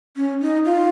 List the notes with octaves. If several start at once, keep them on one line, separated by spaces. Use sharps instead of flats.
C#4
D#4
F4